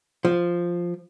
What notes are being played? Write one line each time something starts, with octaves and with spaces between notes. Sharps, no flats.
F3